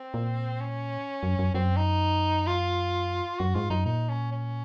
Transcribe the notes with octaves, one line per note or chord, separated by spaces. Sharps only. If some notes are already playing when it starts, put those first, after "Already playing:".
Already playing: C4
A#2
C#4
F#2
F#2
F#2 C4
D#4
F4
F#2 F#4
G#2 F4
F#2 D#4
A#2 D#4
C#4
C#4